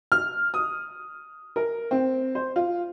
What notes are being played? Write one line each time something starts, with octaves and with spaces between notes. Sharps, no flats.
F6
D#6
A#4
C4
C5
F4